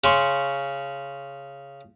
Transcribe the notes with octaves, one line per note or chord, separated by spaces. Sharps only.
C#3 C6 C#6